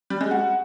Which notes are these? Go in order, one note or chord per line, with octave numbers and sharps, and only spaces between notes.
G3
G#3
F#4